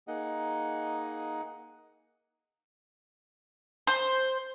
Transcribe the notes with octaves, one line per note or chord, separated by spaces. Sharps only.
A#3 D#4 G#4 D#5 F#5
C5